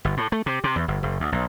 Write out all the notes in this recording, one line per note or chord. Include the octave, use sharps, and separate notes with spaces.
G1
A2
A3
C3
C3
E2
G1
F#1
D2
B1